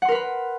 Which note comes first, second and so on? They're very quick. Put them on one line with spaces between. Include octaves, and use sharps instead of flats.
F#5 C6 A#4 B4 B5